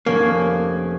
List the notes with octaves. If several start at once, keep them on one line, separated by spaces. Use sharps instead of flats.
F1 A#3 C#4 G#5